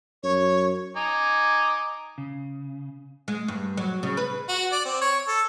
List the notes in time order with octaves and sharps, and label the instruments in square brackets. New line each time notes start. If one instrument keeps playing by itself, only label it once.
[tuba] F#2 [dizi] C#5
[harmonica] D#4 G#5 D6
[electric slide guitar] C#3
[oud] G#3
G2
F#3
C#3
B4
[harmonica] F#4
D5
C4
C#5
A4